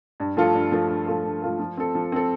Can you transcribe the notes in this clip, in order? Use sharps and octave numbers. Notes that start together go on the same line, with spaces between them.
G2
F3 A3 F4 A4
G2
F3 A3 F4 A4
G2
F3 A3 F4 A4
G2
F3 A3 F4 A4
F3
C4 A4
F3
C4 A4